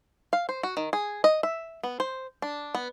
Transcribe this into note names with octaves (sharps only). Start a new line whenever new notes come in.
F5
C5
F#4
D#3
G#4
D#5
E5
B3
C5
D4
B3